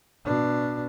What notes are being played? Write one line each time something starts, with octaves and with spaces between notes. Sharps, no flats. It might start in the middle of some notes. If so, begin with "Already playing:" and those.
B2 D4